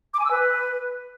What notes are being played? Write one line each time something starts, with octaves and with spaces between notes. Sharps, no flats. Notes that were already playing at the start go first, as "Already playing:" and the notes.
D6
G#5
E6
B4